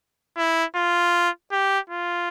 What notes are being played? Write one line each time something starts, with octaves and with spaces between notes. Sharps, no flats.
E4
F4
G4
F4